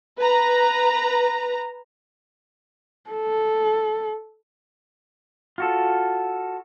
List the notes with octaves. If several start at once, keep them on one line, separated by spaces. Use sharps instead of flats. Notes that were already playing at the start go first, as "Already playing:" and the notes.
B4 A#5
A4
F4 F#4 A4